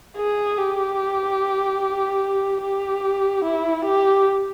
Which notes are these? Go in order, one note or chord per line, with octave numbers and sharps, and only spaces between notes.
G#4
G4
G4
E4
G4